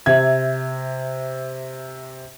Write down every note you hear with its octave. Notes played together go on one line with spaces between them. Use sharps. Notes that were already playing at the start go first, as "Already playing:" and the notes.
C3 E5 G#6